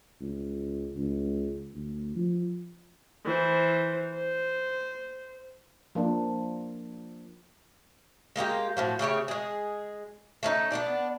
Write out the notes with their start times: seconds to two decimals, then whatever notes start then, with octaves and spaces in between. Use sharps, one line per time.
0.21 C#2
0.97 C#2
1.74 D2
2.16 F3
3.26 E3 C5
4.15 C5
5.95 F3 A#3 D4
8.36 G#3 A#3 F4 G4
8.77 A2 F3 F#3
8.99 C#3 A3 G4 C#5
9.28 G#3 G#4
10.43 A3 C#4 D#4
10.72 B3 D4 D5